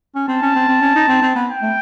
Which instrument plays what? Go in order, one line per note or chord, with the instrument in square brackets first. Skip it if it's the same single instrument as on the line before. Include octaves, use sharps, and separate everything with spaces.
[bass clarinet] C#4
[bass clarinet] C4 [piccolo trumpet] A5
[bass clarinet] C#4
C4
C4
C#4
D#4
C4
C4
B3
[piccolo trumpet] G5
[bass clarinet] A3